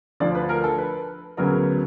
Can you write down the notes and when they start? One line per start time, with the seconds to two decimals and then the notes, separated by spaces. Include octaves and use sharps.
0.20 D2 D3 F3 D5
0.35 B4
0.49 A#4
0.64 A4
0.78 B4
1.37 D2 C#3 F#3 B3 A#4